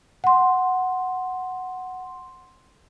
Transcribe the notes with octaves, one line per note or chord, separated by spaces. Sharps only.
F#5 C6